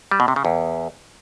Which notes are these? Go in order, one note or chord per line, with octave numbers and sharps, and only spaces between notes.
G3
B2
C3
C#3
E2